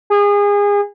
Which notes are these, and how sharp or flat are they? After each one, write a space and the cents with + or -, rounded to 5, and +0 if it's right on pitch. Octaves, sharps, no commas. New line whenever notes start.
G#4 -30